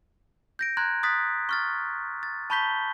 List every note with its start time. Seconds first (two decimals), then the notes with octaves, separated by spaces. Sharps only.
0.59 G6 A#6 D7
0.77 A#5 C6 F#6 G#6
1.03 C6 D#6 F#6 A6 B6
1.49 C#6 F6 A6
2.23 A6
2.50 A5 B5 C#6 G6 B6 G7